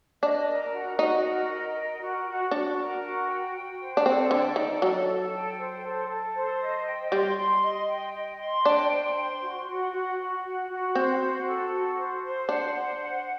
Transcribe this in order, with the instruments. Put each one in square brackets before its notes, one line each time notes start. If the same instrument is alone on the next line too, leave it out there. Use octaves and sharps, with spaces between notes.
[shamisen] D4 [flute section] D#5
[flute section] A#4
F#4
[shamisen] D#4 [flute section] F#4
[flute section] A#4
D#5
A#4
F#4
F#4
[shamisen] D4 [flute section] F#4
[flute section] A#4
F#4
G5
G5
C5
[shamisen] D4
[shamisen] C4 [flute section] A4
[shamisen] D3 [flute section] G5
[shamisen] D#3 [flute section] A4
[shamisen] F#3 [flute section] A4
[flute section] A4
G5
C5
A4
A4
C5
D#5
G5
[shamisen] G3 [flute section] C6
[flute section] C6
D#5
G5
D#5
C6
[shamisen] D4 [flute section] G5
[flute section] C5
C6
F#4
F#4
F#4
F#4
F#4
F#4
[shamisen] C4 [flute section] C5
[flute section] F#4
A4
F#4
C5
C5
[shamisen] D4 [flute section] F#5
[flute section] C5
F#5